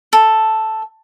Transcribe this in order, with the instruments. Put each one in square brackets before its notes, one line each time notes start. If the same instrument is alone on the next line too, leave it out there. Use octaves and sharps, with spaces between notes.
[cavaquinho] A4